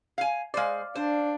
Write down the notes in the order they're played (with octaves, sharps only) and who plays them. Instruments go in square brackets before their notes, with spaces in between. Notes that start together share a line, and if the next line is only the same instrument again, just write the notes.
[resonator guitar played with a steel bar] F5 G#5
[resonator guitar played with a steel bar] G#3 C5 [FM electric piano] D5 F5
[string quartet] D4 [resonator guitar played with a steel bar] C5